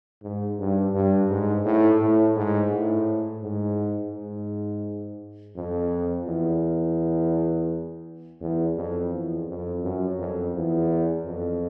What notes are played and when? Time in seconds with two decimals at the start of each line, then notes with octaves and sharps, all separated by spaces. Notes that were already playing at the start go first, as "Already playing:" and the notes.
0.23 G#2
0.59 G2
0.95 G2
1.30 G#2
1.65 A2
2.02 A2
2.37 G#2
2.73 A2
3.43 G#2
4.14 G#2
5.56 F2
6.27 E2
8.41 E2
8.76 F2
9.13 E2
9.47 F2
9.83 F#2
10.19 F2
10.55 E2
11.25 F2